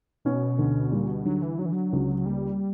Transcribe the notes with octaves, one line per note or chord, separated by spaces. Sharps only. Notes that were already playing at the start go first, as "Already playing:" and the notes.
B2 C#4
D2
A#2 G3
B2
D3 F#3
E3
F#3 D4
E3
F#3
C#2
G3 A#3